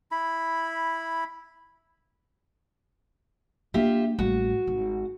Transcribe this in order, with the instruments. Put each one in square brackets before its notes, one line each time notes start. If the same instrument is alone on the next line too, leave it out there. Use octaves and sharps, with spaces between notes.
[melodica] E4 B5
[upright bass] A#3 D4 [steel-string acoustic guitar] F4 G4 E5
[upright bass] A1 G3 [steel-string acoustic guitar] F#4
[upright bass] G#1